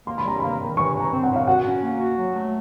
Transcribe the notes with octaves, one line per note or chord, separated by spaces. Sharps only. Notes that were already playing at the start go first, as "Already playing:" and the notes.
A#3 C6
B5
G3 A#5
A#3 B5
D#3
E3 C#6
E3
A#5
C4
F#5
A2
F5
F#4 F#5
C#4
A#3
F#4
F#3
A3